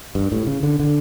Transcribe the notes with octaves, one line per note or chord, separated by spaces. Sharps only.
G2
A2
C#3
D3
D3